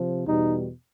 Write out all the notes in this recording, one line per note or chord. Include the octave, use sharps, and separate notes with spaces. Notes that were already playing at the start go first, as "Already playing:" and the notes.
Already playing: C3 F3
E2 B2 G3 D#4